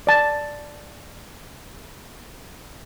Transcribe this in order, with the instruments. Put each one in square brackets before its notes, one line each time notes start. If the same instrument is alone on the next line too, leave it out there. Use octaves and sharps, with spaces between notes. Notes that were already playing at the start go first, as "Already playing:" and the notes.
[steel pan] D5 A5